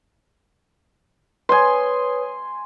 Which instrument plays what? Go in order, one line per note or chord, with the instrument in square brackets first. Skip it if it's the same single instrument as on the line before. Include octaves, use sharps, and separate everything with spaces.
[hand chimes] B4 C#5 D#6 [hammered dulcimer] G#5 C6